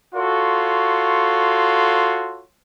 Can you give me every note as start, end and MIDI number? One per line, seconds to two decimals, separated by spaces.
0.15 2.42 65
0.15 2.42 66
0.15 2.42 69
0.15 2.42 73
0.15 2.42 84